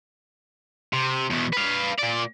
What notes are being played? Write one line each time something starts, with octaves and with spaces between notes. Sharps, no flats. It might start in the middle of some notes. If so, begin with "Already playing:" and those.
C3
E2 B2
B4 F5
A#2 D5